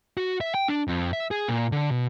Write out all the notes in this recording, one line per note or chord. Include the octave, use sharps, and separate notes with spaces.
F#4
E5
G5
D4
F2
E5
G#4
A#2
D3
B2